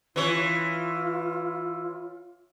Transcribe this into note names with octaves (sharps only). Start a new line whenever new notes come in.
E3 F4 C#5